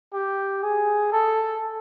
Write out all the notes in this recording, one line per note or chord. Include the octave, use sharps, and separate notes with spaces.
G4
G#4
A4